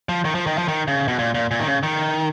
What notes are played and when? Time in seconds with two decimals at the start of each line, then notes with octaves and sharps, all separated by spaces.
0.09 F3
0.25 D#3
0.35 F3
0.46 D#3
0.58 F3
0.68 D#3
0.88 C#3
1.08 B2
1.19 A#2
1.34 A#2
1.51 A#2
1.59 D#3
1.66 C#3
1.83 D#3